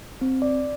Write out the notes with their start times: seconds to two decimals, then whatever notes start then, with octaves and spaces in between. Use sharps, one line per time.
0.21 C4
0.42 D5